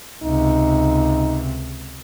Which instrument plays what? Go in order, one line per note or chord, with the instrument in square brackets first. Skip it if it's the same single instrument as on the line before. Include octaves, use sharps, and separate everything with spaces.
[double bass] C#2 C3 [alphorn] D#4